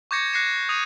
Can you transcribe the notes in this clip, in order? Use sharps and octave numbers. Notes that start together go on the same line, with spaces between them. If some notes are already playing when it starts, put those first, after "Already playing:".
C#6 D6 G6 G#6 A#6 C#7
F#6 A#6 C7 C#7 E7
D#6 G#6 D#7 F7